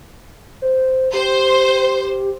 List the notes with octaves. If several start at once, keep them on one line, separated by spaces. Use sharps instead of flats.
C5
G4 C5